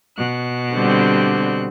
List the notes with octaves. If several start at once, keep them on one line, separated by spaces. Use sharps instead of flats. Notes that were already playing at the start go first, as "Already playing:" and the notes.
B2 F#6
D3 G3 C4